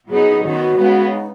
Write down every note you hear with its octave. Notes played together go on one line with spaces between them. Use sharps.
F#3 B3 D#4 G#4
F#2 D#3 B3 F#4
C#3 G#3 B3
D#4